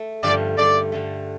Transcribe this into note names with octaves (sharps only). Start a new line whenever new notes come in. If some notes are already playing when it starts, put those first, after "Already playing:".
Already playing: A3
G2 D3 F3 A3 D5
G2 D3 A3 D5
G2 D3 A3